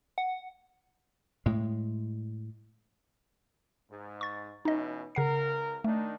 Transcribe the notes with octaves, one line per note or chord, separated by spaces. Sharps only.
F#5
A2 G#3
G#2
C#6 A6
B2 E3 C#4 D#4 D#5
C#2 C#3 A#4 F#5 C7
D#3 A3 D4 D#4